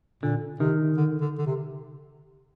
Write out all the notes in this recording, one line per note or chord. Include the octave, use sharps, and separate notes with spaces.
A#2 D3
C3 D#3
D3
D3
D3
C3